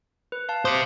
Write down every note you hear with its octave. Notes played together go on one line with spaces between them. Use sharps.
B4
F5 A5
G4 C5 D6 D#6 G6